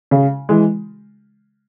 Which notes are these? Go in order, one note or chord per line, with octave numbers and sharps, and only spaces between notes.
C#3
E3 G#3